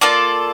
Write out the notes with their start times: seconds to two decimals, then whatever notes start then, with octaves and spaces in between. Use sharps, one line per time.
0.01 A#3 F4 A4 D5